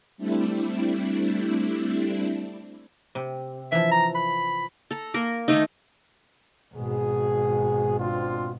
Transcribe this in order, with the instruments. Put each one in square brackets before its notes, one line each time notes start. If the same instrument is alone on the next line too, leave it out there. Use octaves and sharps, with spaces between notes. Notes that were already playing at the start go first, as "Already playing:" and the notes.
[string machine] G3 A3 C4 D4 E4
[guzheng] C3
[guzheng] E3 F3 [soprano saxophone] E5
[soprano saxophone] A#5
B5
[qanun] A4 A#5
A#3 A#4
D#3 A3 D#4
[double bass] G#1 B2 [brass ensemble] G#4
[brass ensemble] C4 D4 F4